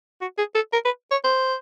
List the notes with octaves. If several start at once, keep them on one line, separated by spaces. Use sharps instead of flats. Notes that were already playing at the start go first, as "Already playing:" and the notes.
F#4
G#4
A4
A#4
B4
C#5
C5